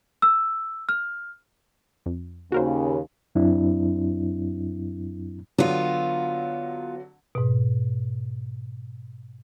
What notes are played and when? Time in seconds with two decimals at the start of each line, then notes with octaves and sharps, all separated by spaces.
0.22 E6
0.89 F6
2.06 F2
2.52 D#2 C#3 F#4 A#4 C5
3.35 F#2 F#3 C4 D4 E4
5.58 D3 F#3 B3 F4
7.35 G#2 B2